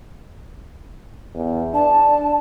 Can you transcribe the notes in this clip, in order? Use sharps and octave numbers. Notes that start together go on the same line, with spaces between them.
E2
D4 A5